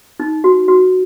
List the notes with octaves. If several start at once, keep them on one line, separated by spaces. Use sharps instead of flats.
D#4
F#4
F#4